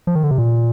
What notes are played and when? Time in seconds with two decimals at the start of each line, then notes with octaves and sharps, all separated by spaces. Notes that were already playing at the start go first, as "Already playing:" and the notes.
0.07 F3
0.15 D#3
0.23 D3
0.31 C3
0.38 A#2